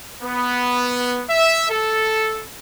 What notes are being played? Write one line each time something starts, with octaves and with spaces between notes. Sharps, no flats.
B3
E5
A4